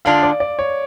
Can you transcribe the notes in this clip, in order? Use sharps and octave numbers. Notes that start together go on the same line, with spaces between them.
D3 G#3 D4 F4 F5
D5
D5
C#5